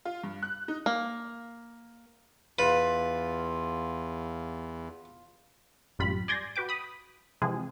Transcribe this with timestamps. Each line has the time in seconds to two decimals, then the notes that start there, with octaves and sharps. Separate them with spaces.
0.05 F4
0.23 G2
0.43 F#6
0.68 D#4
0.86 A#3
2.59 E2 F4 B4
5.99 A1 F#2 G3 F4 B5
6.28 D5 G#5 C6 G6 G#6 A#6
6.56 F#4 B4 G5 D6
6.69 B5 D#6
7.42 C3 E3 F3 G#3 C4 G#4